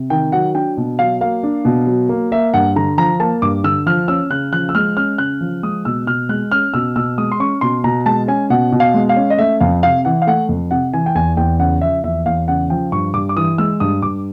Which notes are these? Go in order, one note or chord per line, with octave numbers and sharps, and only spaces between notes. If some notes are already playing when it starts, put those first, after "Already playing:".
Already playing: C3
D#3 G5
F#3 F#5
D4 G5
B2
F#3 F5
A#3 F5
D4
B2
F#3
A#3
A#3 E5
G2 F#5
D3 A#5
F3 A#5
A#3 A5
G2 D6
D3 E6
F3 F6
C#4 E6
C#3 F#6
F3 F#6
E6
G#3 F6
C#4 F6
C#3 F#6
F3
G#3 D#6
B2 E6
B2 F6
G#3 F#6
C#4 F6
B2 E6
B2 E6
G#3 D#6
C6
C#4 C#6
B2 C6
B2 A#5
G#3 A5
C#4 G#5
B2 F#5
B2
F5
G#3
F5
C#4
D#5
A3 E5
F2 F5
C3 F5
E3 F#5
F5
A3 F#5
F2
C3 F#5
E3 G#5
G5
E2 G#5
E2 G5
C#3 F#5
F3 E5
E2 E5
E2 F5
C#3 F#5
F3 G5
G2 C#6
G2 D6
D6
E3 D#6
G#3 E6
G2 D#6
G2 D6